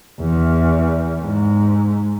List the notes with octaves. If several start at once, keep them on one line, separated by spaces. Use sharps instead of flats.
E2
G#2